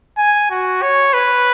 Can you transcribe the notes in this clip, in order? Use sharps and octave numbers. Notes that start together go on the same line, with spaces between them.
G#5
F#4
C#5
B4